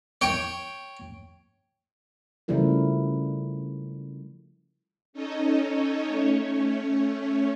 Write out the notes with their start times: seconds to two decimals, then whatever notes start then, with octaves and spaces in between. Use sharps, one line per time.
0.21 C#5 G5
2.48 C#3 F3 G3 A3 E4 A#4
5.13 C#4 D#4 A4 C#5 D#5
6.05 A3 C#4 C#5